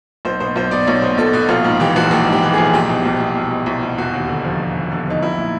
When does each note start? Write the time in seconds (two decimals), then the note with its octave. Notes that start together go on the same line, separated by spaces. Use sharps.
0.25 B1 C5
0.40 B2 C5
0.56 B1 C5
0.71 B2 D5
0.87 B1 C#5
1.02 B2 C5
1.18 B1 A4
1.33 B2 F#4
1.49 A#1 F4
1.64 G#2 F4
1.80 E3 G4
1.96 A#1 F#4
2.11 A#1 G4
2.27 G#2
2.32 G4
2.42 E3
2.53 A#1 G#4
2.73 C2 G4
2.89 B2
3.05 C2
3.20 B2
3.36 C2
3.51 B2
3.66 C2
3.83 B2
3.98 E1 F#4
4.14 D#2
4.28 D3
4.44 F3
4.60 E1
4.76 D#2
4.92 D3
5.07 F3 D#4
5.22 B1 E4
5.38 A#2